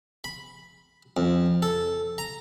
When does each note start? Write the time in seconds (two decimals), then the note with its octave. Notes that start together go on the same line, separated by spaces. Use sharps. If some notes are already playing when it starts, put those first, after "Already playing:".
0.24 B5
1.17 F2
1.62 A4
2.18 A#5